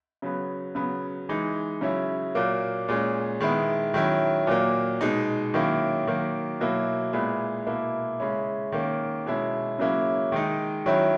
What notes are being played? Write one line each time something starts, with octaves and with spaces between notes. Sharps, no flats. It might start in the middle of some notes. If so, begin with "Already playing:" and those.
C#3 F#3 B3
C#3 F#3 B3
E3 G#3 D#4
C#3 F#3 C#4 E4
A#2 F#3 A#3
A#2 G#3 C#4
D#3 G#3 B3 E4
D#3 F#3 C#4 E4
A#2 F#3 A#3
B2 G#3 D#4
D#3 F#3 A#3 C#4 E4
D#3 F#3 A#3
B2 F#3 A#3 E4
A#2 G#3 B3 E4
B2 A#3 E4
C#3 G#3 C#4 E4
D#3 A#3 C#4
B2 G#3 C#4 E4
C#3 F#3 A#3 C#4 E4
D#3 G#3 D#4
D#3 F#3 C#4 E4